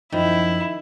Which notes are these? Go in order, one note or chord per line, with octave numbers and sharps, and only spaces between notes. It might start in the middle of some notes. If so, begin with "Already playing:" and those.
F#2 D#3 F3 E4